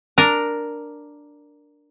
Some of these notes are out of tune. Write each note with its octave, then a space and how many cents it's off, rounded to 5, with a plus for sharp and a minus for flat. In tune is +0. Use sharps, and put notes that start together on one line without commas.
D4 +0 A#4 +0